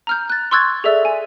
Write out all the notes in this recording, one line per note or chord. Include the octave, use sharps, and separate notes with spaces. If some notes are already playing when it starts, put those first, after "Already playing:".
A#5 F6 G6
F#6 A6
C6 C#6 E6 F#6 G#6 A6
G#4 A4 D5 E5 E6
G#5